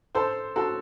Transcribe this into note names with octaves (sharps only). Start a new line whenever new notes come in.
A4 C5
F#4 A4